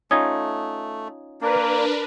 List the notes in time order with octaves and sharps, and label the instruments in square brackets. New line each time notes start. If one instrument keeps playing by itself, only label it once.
[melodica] A3 [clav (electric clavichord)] C#4 D#4 F4 [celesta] D#6 G#6
[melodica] A#3 [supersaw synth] D4 A#4 B4